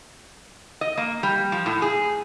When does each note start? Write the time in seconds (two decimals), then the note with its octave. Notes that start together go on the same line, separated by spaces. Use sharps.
0.81 D#5
0.97 A#3
1.23 G3
1.52 F3
1.66 A2
1.82 G#4